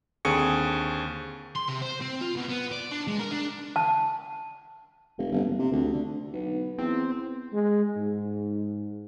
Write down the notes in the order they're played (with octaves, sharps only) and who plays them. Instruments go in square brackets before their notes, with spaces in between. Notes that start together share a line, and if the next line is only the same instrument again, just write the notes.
[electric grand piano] D#2 D3 C4 G#4 C#6 C#7
[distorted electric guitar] C6
C3
C5
C4
F4
B2
B3
D5
D4
G#3
A#4
D4
[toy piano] A5
[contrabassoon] F1
G1
F#1
C3
D2
D3
[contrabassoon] B1 [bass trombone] B3
[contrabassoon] E2 [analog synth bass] C4
[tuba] G#3
G#2